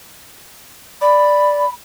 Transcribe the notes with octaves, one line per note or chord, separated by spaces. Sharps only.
D5 B5